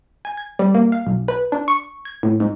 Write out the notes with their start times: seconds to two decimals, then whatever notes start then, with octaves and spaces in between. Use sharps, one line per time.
0.25 G#5
0.37 G#6
0.59 G3
0.75 A#3
0.92 F5
1.07 B1
1.28 B4
1.52 D4
1.68 C#6
2.05 G#6
2.23 A2
2.40 G#2